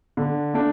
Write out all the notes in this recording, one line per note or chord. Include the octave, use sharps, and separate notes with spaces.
D3
A3 D4